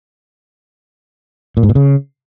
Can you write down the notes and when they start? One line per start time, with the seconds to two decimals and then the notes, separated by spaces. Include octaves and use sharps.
1.57 A#2
1.63 G#2
1.69 A#2
1.75 C#3